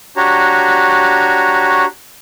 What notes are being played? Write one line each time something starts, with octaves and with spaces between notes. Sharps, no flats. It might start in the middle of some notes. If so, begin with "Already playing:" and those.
D4 F#4 G4 C#5 A#5